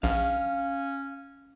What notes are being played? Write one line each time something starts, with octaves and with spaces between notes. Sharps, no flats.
A#1 C#4 F5